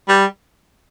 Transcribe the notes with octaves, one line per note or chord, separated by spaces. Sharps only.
G3